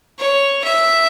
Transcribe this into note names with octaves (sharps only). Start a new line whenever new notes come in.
C#5
E5